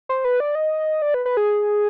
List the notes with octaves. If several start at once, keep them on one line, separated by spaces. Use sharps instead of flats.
C5
B4
D5
D#5
D5
B4
B4
G#4